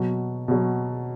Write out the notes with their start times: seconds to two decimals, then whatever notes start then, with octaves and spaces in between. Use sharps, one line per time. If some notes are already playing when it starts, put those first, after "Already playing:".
Already playing: B2 F#3
0.48 B2 F#3